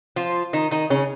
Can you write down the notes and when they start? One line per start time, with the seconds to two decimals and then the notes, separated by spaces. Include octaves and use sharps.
0.16 F3 F4
0.53 D#3 D#4
0.71 D#3 D#4
0.90 C#3 C#4